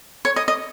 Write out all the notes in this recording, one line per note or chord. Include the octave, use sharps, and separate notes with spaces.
C#5
D#5
D#5